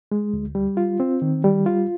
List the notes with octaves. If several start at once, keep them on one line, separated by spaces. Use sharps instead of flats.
G#3
D2
G3
F4
C4
D#3
G3
F4